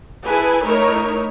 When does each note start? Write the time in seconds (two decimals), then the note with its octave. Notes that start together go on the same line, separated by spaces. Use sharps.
0.25 E4 G#4 A4 B4 G#5
0.64 A3 D#4 E4 A#4 C#5